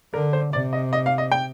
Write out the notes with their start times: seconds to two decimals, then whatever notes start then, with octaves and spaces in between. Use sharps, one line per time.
0.14 D3 A#4
0.33 C5
0.53 C3 D5
0.73 D#5
0.93 D#5
1.06 F5
1.18 D#5
1.32 G5